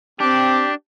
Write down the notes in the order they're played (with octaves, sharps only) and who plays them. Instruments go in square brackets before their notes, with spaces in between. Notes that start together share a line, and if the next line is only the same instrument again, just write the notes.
[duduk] C4 [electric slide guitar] D4 [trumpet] G4 [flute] D6